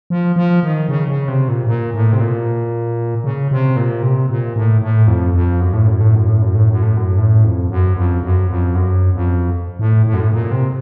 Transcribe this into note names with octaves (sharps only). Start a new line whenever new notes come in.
F3
F3
D#3
C#3
C#3
C3
A#2
A#2
A2
C3
A#2
C#3
C3
A#2
C3
A#2
A2
A2
F2
F2
F#2
A2
F#2
A2
F#2
A2
F#2
A2
F#2
A2
F#2
A2
F2
F#2
F2
F#2
F2
F#2
F2
A2
A2
F#2
A2
A#2
C3